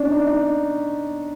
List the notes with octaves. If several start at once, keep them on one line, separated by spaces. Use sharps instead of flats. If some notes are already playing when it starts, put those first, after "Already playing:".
Already playing: C#4 D4
D#4
D#4